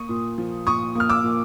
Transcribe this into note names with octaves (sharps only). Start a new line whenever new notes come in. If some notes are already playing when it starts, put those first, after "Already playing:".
Already playing: A#3 C#6 D#6
A#2
F3
A#2 C#6 D#6
A#3 F6
D6 E6
A#2